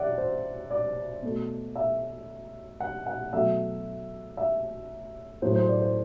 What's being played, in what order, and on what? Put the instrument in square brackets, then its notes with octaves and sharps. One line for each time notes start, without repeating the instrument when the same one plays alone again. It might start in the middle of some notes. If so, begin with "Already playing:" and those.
Already playing: [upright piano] D5 E5 F#5
C5
D5
B2 A3
E5
F#5
F#5
B2 F#3 A3 E5
E5
A2 F#3 A3 C5
C5
D5
C5